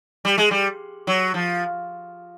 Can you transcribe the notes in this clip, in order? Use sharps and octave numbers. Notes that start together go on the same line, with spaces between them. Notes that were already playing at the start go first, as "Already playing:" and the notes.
G3
G#3
G3
F#3
F3